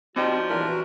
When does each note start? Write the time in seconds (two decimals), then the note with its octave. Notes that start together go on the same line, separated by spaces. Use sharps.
0.16 F3 C4 D4 D#4 F#4 G4
0.50 E2 G2 A#2 F#3 D4 E4 A#4
0.68 E3 F#4